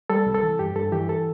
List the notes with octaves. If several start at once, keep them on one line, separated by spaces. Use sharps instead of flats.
G3 A4
C2
A4
E3
G2 G4
G2 A4
E3 G4
A4